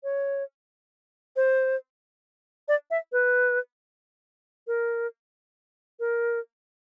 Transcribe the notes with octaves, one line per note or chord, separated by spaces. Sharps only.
C#5
C5
D5
E5
B4
A#4
A#4